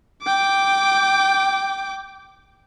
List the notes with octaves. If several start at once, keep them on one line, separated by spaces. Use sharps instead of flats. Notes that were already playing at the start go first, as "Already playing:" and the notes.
G5 D6